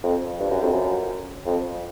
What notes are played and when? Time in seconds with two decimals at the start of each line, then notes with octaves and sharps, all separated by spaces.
0.04 F2
0.40 G2
0.51 F#2
0.62 F2
0.73 F#2
1.46 F2